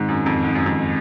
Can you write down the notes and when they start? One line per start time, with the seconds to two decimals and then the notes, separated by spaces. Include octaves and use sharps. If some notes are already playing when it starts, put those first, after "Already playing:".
Already playing: G#2 D#3 G#3 C4
0.08 F#2
0.26 F2
0.44 G#2
0.55 F#2
0.66 F2